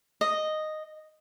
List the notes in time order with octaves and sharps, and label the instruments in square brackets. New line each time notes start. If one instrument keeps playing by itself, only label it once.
[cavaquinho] D#5